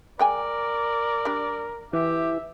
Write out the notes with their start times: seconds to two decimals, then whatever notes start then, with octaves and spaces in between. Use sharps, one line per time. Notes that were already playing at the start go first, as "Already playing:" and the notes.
0.19 G#3 A#4 D5 G5 G#5
1.25 G3 D4
1.93 E3 G4 E5